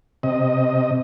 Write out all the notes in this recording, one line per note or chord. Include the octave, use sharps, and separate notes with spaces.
C3 D#5